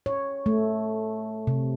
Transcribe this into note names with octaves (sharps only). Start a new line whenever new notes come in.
C#5
A3
C3